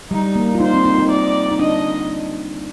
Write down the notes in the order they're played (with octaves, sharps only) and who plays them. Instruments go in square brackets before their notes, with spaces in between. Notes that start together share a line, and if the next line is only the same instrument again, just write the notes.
[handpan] G3 [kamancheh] D#4
[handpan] A#3
F4
[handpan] D#4 [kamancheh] C5
[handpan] C4
D#4
D#4
[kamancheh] D5
[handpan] D#4
[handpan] D4 [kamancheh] D#5